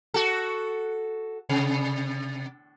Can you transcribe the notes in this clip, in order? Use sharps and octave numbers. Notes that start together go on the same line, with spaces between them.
F#4 A4
C3